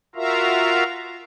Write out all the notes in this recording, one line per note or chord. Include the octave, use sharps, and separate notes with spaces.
F4 F#4 A#4 E5 F5 A#5